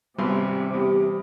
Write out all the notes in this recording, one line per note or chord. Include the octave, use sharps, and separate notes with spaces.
G#1 C3 G3 B3 C6
E2 G4